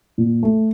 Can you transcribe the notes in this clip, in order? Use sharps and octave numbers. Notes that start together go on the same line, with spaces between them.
A#2
A3